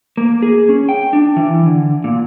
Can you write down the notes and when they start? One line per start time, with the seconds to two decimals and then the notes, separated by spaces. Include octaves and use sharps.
0.17 A#3
0.42 G#4
0.69 C#4
0.89 G5
1.13 D4
1.36 E3
1.66 D3
2.04 A#2